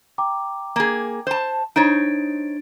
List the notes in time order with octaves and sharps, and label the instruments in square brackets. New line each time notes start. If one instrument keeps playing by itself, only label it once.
[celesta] G5 A#5 D6
[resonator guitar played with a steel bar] A#3 G#4
C5 A5
[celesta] D4 A6 D7 [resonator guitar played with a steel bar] D#4 C5 C#5